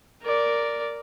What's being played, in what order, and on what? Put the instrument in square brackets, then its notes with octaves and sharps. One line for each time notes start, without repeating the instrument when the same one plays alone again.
[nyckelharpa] A#4 D5